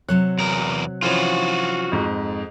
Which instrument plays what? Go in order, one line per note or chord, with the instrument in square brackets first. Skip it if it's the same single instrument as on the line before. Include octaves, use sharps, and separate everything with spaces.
[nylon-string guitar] C3 F#3 C#5 [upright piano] F#6
[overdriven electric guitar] E2 A#4
[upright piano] E3 F3 C#4 [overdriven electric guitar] F4 F#4
[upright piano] F2 G#2